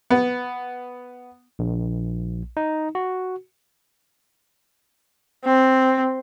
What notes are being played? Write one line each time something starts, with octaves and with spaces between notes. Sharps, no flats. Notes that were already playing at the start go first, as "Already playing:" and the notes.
B3
A#1
D#4
F#4
C4